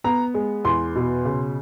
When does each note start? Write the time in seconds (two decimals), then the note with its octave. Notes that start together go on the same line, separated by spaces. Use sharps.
0.04 B3 A#5
0.34 G#3
0.65 E2 C6
0.96 B2
1.25 C#3